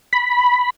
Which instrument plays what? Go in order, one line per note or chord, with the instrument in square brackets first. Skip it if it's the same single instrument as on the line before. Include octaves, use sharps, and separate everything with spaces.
[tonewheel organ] B5